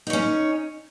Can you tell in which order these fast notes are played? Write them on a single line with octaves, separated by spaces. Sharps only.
D#4 C#5 C#4